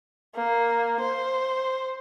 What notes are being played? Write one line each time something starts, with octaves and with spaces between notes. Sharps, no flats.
A#3
C5